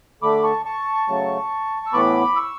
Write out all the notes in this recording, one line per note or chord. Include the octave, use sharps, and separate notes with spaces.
D3 A3 B5 D6
A5 C#6
A5 C#6
C#3 F#3 A3
E6
A2 E3 B3 B5 D6
C#6 E6